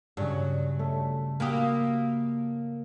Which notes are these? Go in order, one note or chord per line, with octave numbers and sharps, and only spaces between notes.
G2 C#3 F#3
A3
A#3 F#4 G4 B5 D#6 E6